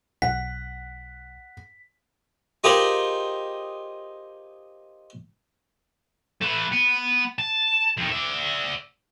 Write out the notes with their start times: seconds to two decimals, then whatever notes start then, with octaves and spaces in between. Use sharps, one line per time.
0.22 B1 F#5 B6
2.64 D#4 F4 G4 G#4 A#4 C5
6.41 A3 B4
6.72 B3
7.39 A5
7.97 F2 D#3
8.12 D5 E5